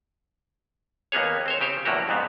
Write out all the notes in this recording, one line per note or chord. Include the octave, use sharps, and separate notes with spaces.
D#2 A#3 B3 G#4 C#5
C4 C5 C#5
C#3 G4 C5 C#5
E2 A2 F#3 A#3 F#4 G4
F2 G#2 B3 C4